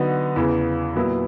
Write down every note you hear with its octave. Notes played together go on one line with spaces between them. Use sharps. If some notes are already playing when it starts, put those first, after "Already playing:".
Already playing: D3 F#3 B3 D#4 F#4
E2 C#3 E3
A#2 F#3 B3 E4